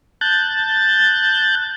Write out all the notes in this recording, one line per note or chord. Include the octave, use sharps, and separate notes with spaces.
A5 F#6 G6 A6